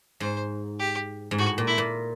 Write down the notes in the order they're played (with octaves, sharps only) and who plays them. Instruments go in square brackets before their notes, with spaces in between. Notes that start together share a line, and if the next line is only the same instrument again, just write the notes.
[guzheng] G#2 [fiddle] C5
[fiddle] G4
[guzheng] G#2
[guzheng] A2 [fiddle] F#4
[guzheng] A#2
[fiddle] E4
[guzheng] A#2